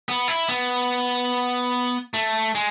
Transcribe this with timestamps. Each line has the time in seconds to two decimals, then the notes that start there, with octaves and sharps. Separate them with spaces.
0.08 B3
0.28 E4
0.49 B3
2.14 A3
2.55 G#3